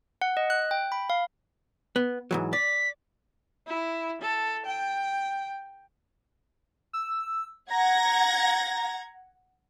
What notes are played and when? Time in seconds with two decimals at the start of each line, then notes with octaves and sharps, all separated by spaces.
0.22 F#5
0.37 D#5
0.50 F#6
0.71 G5
0.92 B5
1.10 F5
1.96 B3
2.31 G#2 E3 F#3
2.53 D5 B6
3.67 E4
4.21 A4
4.65 G5
6.93 E6
7.70 F#5 A#5 G#6 A#6